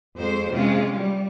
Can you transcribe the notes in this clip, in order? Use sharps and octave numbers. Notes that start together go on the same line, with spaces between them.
F2 G#3 C5
C3 G#3 C#4 F4
G3